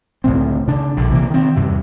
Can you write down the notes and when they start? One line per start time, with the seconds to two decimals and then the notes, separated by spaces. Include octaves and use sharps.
0.24 C#2 A2 D3 C4
0.67 C#3 D4
0.97 A#1 D3
1.10 C3 E3 F#3 A#3
1.30 D#3 C4
1.56 E2 G2 C3